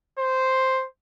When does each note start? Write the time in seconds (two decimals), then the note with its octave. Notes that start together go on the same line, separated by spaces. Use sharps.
0.19 C5